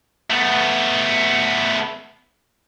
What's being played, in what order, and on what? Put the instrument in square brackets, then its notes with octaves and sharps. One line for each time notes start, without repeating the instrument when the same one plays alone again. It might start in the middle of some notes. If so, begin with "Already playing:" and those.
[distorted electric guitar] A3 B3